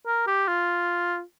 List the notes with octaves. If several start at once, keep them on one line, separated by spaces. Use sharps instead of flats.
A#4
G4
F4